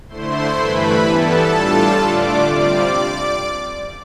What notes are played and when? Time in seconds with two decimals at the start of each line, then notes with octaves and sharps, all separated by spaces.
0.08 D3 A3 E4 C5 C6
0.56 G2 E3 A3 E4 B4 B5
1.03 E3 G3 B3 E4 A4 A5
1.51 A2 G3 D4 F4
1.98 D3 A3 D4 F4 D5 D6
2.46 C3 G3 C4 F4 D5 D6